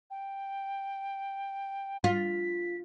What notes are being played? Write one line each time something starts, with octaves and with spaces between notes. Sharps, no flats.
G5
F4 B6